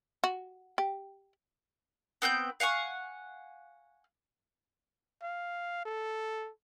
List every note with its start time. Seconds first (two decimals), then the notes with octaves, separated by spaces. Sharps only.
0.24 F#4
0.78 G4
2.22 B3 C4 G5 G6
2.60 F5 F#5 G#5 C#6
5.22 F5
5.85 A4